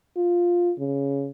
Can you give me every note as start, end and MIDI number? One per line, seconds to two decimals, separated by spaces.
0.17 0.72 65
0.79 1.30 49